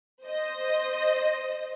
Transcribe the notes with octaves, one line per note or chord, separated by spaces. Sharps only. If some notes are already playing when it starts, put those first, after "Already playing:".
C5 D#5